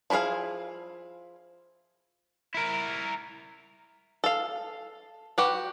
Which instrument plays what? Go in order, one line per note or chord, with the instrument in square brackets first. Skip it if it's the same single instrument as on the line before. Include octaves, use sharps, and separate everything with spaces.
[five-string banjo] F3 E4 F#4 G#4 F5
[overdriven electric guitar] E4 A#4
[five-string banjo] A4 F5
F#4 G4 B4